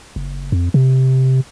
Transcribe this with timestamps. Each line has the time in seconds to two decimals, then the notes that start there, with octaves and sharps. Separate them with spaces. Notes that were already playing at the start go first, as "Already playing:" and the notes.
0.16 F#1
0.52 F2
0.74 C3